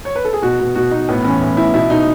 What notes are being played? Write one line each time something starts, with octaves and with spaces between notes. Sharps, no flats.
C#5
B4
A4
G#4
B2 F#4
B2
B2 F#4
B2 D#4
A2 B3
E3 C#4
A2
A2 E4
B2 E4
B2 D#4